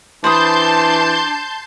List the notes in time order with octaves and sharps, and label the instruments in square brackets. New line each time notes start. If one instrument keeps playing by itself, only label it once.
[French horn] E3 [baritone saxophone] D4 [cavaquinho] C5 B5 D#6 [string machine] A5 C6 G6